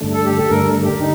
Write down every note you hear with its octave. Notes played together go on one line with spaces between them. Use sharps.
G2 D3 A3
A4
G4
A4
G2 D3 A3 A#4
G4
D3 D#4